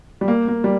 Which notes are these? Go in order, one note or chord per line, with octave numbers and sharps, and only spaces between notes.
G3
A#3
A#3
G3